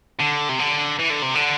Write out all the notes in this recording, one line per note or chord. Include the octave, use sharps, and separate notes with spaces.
D3
C3
D3
E3
D3
C3
D3